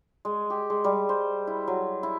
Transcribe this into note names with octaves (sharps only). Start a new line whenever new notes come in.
G#3
G4
G#3
G3
C5
E4
F#3
E4